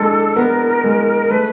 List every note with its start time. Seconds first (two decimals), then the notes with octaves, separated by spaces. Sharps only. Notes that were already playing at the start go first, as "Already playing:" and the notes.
Already playing: G#3 D4 A4
0.36 B3 A#4
0.84 G#3
1.31 A3 B4